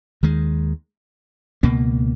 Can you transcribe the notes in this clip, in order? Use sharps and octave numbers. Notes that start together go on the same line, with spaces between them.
D#2 D#3 G#3
C#2 B2 A#3